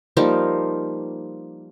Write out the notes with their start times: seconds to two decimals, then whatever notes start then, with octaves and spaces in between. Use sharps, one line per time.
0.17 F3 G3 A#3 D#4